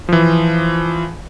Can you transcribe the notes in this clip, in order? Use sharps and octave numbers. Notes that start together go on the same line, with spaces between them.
E3 F3